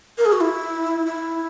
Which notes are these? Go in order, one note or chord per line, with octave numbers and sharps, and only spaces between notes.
A#4
G#4
F#4
E4
E4